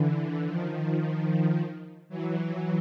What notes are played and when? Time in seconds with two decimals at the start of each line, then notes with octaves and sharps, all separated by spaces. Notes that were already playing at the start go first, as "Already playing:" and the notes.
Already playing: D3 E3
0.47 D#3 F3
2.09 E3 F#3